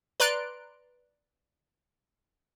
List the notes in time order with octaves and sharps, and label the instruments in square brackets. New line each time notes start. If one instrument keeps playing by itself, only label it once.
[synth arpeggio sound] B4 D5 A#5 C6 F#6 D7